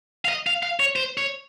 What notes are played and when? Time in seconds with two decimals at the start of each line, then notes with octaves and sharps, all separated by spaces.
0.25 F5
0.29 D#5
0.47 F5
0.63 F5
0.80 C#5
0.96 C5
1.17 C#5